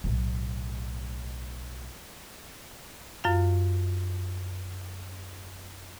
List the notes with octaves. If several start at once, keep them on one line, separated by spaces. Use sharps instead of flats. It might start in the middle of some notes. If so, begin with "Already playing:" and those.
B1 A2
F#2 F4 F5